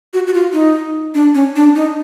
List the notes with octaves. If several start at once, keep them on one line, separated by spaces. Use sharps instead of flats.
F#4
F#4
F4
D#4
D4
C#4
D4
D#4